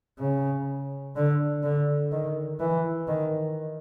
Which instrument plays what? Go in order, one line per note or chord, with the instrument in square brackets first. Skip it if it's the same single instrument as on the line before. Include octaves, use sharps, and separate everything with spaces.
[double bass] C#3
D3
D3
D#3
E3
D#3